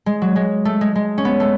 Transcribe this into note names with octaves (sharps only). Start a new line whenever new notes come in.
G#3
F#3
G#3
A3
G#3
G#3
C#4
B3
A3